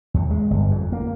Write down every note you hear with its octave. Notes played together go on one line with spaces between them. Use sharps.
D#2
G#3
G1
F2
A#3